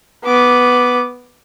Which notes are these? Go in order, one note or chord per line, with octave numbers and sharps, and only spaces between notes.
B3 D6